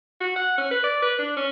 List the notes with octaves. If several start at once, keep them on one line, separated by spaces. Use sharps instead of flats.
F#4
F#5
C#4
B4
D5
B4
D4
C#4